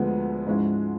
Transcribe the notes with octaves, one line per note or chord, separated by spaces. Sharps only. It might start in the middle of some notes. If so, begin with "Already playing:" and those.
Already playing: D2 D3 F3 G#3 B3
G#2 F3 G#3 C#4 E4